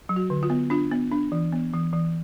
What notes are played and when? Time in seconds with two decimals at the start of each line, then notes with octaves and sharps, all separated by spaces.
0.09 F#3
0.16 F#4
0.30 D3
0.43 F4
0.50 B3
0.70 D4 F4
0.92 B3
1.12 D4
1.32 E3
1.52 B3
1.74 E3
1.93 E3